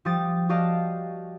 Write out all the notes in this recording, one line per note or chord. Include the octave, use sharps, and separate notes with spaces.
F3 G3 G4 D#6 A6
F#4 G4 D5 D#5 F5 A5